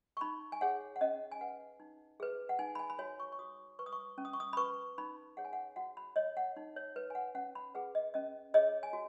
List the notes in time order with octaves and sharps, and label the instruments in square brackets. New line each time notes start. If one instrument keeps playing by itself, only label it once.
[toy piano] C#6
D#4 B5
G#5
G#4 C#5 F#5
F#5
C#4 D#5
G#5
B4 F#5
D#4
G#4 B4
F#5
D#4 G#5
B5
G#5
B5
F#4 C#5 G#5
C#6
C#6
F#4 D#6
B4 C#6
D#6
C#6
C#4
D#6
C#6
D#6
B5
B4 C#6
D#4 B5
G#4 C#5 F#5
G#5
F#5
F#4 F#5
B5
C#5 D#5
F#5
D#4
C#5
B4
G#5
F#5
C#4 F#5
B5
G#4 B4 F#5
D#5
C#4 D#5
G#4 C#5 D#5
G#5
F#4